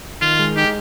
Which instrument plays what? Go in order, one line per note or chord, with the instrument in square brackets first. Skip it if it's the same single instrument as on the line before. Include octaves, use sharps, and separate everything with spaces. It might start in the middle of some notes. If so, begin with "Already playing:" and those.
[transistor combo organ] D#3 [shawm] F4
[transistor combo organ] G#3
[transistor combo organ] D#4 [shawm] G4